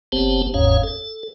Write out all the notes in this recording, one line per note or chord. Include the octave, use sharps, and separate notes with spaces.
F#1 B3 C4 G4 C5 A5
F#1 D#2 G#2 C#4 C#5 F5
A4